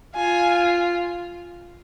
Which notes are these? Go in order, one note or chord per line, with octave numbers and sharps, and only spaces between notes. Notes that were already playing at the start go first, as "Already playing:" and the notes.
F4 G#5